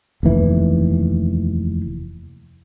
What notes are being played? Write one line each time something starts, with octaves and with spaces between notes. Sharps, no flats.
F1 D#2 E3